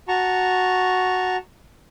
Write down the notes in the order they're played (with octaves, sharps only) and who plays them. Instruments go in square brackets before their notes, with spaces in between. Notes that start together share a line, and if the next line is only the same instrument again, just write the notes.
[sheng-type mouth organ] F#4 A5 A#5 C#6